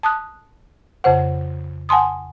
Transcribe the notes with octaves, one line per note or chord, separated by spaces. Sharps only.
A5 D#6 F#6
F2 C#3 C5 F#5
F#5 G#5 A5 C6 D#6